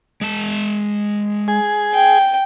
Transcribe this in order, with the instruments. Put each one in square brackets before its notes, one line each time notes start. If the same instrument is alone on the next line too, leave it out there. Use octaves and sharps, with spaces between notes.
[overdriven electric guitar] G#3 A5
[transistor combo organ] G#4
[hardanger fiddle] G5